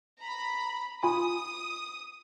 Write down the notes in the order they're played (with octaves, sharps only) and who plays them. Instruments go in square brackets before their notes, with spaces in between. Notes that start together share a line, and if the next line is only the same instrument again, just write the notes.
[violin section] A#5 B5
[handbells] F4 G#5 B5 [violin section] D#6